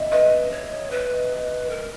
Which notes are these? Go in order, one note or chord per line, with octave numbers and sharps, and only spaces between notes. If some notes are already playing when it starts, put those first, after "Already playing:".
Already playing: D#5 E5
B4 D#5
C#5
B4
A#4